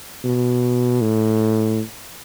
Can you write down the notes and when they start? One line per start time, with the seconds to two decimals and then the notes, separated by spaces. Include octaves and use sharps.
0.24 B2
1.02 A2